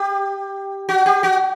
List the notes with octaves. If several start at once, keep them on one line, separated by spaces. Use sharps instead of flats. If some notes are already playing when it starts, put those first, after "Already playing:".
Already playing: G4
F#4
G4
F#4